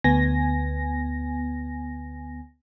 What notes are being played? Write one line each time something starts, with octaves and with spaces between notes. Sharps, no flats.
D2 B3 G#5 A#6